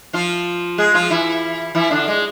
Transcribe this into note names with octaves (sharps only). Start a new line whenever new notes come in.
F3 F4
G#3 G#4
F3 F4
E3 E4
E3 E4
D3 D4
G#3